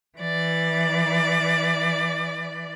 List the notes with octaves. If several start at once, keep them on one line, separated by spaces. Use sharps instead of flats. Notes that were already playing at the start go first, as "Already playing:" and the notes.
E3 D5